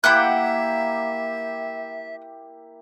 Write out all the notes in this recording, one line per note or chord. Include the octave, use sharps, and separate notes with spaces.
A#3 E4 G4 E5 F#5 G5 F#6